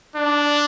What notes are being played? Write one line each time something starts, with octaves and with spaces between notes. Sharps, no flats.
D4